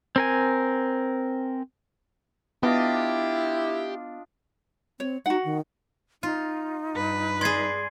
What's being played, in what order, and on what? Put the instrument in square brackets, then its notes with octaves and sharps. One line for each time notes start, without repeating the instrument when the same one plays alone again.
[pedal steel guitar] C4 A#4 G#5
[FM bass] B3 [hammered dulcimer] D4 F4 D#5 [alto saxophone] E4 [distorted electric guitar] G4
[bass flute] C4 [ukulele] C#5
[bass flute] D#4 [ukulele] F#4 F#5
[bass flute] D#3
[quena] D#4 [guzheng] F4
[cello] G2 B4
[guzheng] G#4 D5 [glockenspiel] C6 G#6 C7